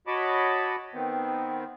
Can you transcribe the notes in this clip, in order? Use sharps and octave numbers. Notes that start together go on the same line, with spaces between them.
F#4 C#5 D#5 A5 B5 D6
D#3 B3 C4